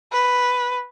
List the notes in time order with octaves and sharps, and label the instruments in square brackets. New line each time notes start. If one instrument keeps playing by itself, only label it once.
[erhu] B4